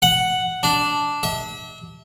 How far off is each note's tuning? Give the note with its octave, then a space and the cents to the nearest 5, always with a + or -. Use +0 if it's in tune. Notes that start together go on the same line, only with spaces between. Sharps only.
F#5 +0
D4 -5
E5 -35